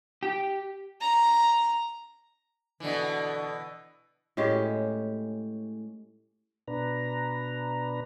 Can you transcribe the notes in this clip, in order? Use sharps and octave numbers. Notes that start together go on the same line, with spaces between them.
G4
A#5
B2 D3 E3
A2 G#3 C#4 G4
B2 D4 B4 A#5